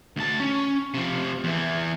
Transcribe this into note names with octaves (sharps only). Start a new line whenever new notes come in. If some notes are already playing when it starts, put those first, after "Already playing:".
D2 A5
C#4
C3 F3
E2 E3